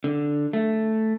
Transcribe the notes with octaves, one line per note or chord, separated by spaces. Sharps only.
D3
A3